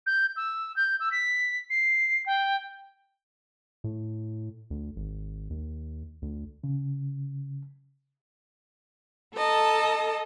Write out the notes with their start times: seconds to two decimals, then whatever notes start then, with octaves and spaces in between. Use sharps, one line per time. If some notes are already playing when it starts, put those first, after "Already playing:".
0.06 G6
0.36 E6
0.76 G6
1.00 E6
1.12 B6
1.70 C7
2.26 G5
3.84 A2
4.70 D2
4.96 G#1
5.50 D#2
6.22 D2
6.64 C#3
9.35 A4 D#5 A5 A#5